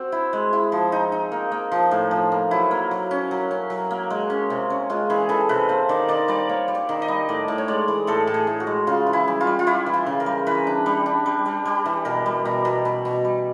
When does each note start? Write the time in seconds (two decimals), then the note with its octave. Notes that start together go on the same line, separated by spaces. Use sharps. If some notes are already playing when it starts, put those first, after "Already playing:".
Already playing: C4 F#4
0.12 E4
0.33 G#3
0.53 E4
0.72 F3
0.92 D#4
1.12 D#4
1.32 A#3
1.52 A#3
1.72 F3
1.91 A2
2.11 F3
2.32 A#3
2.51 F#3 E4
2.71 A#3
2.91 F#3
3.11 C#4
3.31 F#3
3.51 C#4
3.70 F#3
3.91 A#3
4.10 G#3
4.30 C#4
4.50 C3
4.70 C#4
4.90 G#3 F4
5.10 E3 G#4
5.29 E3 A4
5.49 C3 B4
5.69 A#3 C5
5.89 D#3 D5
6.09 D#3 D5
6.28 G3 D5
6.49 A#3 C#5
6.68 G3
6.75 D5
6.89 D#3
7.02 D#5
7.08 G3
7.29 A2 D5
7.48 A2
7.58 C#5
7.68 G#3 D5
7.88 E3
8.07 A2 A4
8.27 A2
8.34 G#4
8.47 A2
8.60 F#4
8.67 G#3
8.87 C#3 F4
9.07 E3
9.13 E4
9.28 G3
9.41 F4
9.47 G3
9.59 F4
9.67 G3 E4
9.86 E3
9.94 F4
10.06 C#3
10.20 A#4
10.26 G3
10.46 E3 B4
10.67 D4
10.86 G3
11.06 D4
11.26 G3
11.46 G3
11.65 G3
11.86 E3
12.05 B2 A#4
12.26 G3
12.45 B2
12.65 B2
12.85 B2
13.05 B2
13.25 G3